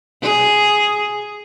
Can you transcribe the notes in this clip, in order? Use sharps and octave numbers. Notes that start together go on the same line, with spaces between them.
G#4